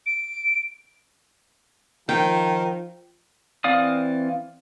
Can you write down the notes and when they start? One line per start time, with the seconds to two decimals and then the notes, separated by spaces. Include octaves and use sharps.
0.06 D7
2.09 D#3 F3 G5
3.64 E3 C4 D5 F5 D#6